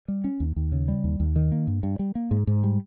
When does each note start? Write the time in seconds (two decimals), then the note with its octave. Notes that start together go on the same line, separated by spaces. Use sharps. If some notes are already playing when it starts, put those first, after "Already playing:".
0.08 G3
0.24 C#4
0.40 D#2
0.56 D#2
0.72 C#3
0.88 G3
1.04 D#2
1.20 D#2
1.36 D#3
1.52 A#3
1.67 G2
1.83 G2
1.99 G3
2.15 A#3
2.31 G#2
2.47 G#2
2.63 G3